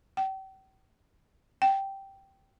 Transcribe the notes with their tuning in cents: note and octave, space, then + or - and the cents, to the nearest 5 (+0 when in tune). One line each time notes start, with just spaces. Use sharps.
G5 -40
G5 -5